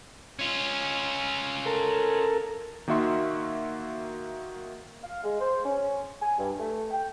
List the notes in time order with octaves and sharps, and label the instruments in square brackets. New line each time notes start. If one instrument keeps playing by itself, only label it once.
[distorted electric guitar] C#4 F4
[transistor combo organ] A4 A#4
[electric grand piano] D#3 A#3 F#4 E5 C6
[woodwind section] F5
G#3
C5
C#4
G#5
G2
A3
G5